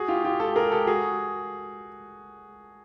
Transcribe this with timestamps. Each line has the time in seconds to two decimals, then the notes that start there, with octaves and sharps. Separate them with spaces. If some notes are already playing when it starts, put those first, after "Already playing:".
Already playing: F#4 G#4
0.08 F4 G4
0.24 F4 G4
0.40 G4 A4
0.56 G#4 A#4
0.72 G4 A4
0.87 F#4 G#4